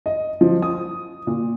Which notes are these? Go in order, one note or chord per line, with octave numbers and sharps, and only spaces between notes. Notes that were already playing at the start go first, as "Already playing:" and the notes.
D#5
F3
D#6
A#2